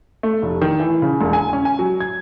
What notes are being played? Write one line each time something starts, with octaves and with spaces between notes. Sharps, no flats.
A3
F1
D#3
E3
C#3
E1
G#5
C#4
G#5
F#3
G#6